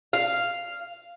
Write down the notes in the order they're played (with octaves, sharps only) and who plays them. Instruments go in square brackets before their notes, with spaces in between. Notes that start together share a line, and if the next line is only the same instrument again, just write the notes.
[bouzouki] F5